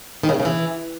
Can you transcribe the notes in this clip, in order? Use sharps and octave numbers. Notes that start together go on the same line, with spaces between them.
D#3
C#3
A2
C#3
E3